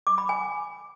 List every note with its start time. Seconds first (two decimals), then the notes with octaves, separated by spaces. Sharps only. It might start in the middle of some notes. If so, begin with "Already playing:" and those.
0.07 D6
0.18 B5
0.29 G#5